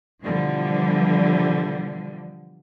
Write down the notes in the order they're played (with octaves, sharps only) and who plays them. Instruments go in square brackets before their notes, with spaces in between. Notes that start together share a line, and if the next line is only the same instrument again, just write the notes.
[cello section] B2 D3 E3 F3 G3